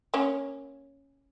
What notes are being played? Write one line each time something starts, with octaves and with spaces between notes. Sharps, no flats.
A#3 C#4